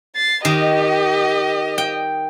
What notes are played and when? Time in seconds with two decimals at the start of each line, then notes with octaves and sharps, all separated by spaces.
0.16 A6 C7
0.45 D#3 G4 D#5
1.78 G5